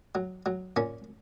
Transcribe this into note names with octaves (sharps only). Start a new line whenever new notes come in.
F#3
F#3
A#2 C#4